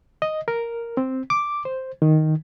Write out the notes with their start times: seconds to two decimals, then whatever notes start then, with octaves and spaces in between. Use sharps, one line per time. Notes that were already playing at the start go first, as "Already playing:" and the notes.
0.22 D#5
0.48 A#4
0.97 C4
1.30 D6
1.65 C5
2.02 D#3